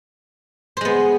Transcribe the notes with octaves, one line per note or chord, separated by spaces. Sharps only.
G#3 B3 C5